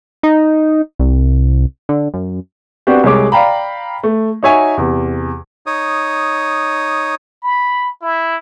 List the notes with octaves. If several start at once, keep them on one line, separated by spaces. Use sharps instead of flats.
D#4
C2
D3
F#2
B3 C4 D4 F#4 G4
C2 C3 G#3 C#5 D6
D5 F5 G5 A#5 B5
A3
D#4 F#4 C#5 E5 G#5
E2 C3
D#4 C#5 D#6
B5
E4